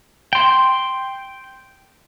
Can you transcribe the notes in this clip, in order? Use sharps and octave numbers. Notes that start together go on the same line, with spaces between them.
G5 C6